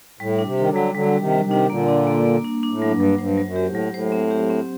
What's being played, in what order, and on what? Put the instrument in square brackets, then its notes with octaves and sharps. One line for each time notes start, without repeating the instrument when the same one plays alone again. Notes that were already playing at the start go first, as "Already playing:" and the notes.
[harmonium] A2 [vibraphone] G3
[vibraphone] D4
[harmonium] C3
[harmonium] D#3 [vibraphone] A4
[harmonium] D3 F#3
[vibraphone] G3
[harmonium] D3 F#3 [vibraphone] G3
[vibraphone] G3
[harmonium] C3 D#3
[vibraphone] G3
[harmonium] F#3
C3 D#3
[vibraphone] D4
[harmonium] A#2 D3 [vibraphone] A#3
[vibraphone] D4
A#3
A#3
D4
D4
[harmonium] A2
[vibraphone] F#3
[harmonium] G2
[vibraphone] F#3
[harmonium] G2 [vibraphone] C5
[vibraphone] F#3
[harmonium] F#2
[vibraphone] G4
[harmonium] A2
[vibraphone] F#3
[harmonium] A2 [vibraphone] C5
[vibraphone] C4
G4
C4